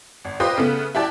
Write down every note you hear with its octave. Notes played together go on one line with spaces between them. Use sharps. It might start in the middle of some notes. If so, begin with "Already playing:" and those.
G#1
F4 G4 B4 C5 D#5
C#3 A3 B3
E4 F#4 G4 D5 A5